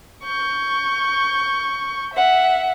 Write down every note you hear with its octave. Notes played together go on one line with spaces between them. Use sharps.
C#6 G6
E5 F#5